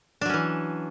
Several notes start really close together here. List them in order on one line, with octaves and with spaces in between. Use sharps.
D4 F#3 C#4 E3